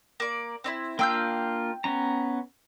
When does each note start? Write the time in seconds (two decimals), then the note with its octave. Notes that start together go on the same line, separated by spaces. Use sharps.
0.20 A#3 D5
0.64 C4 D#4 E4
0.99 A#3 D4 F4 G5 E6 G6
1.84 B3 C#4 A#5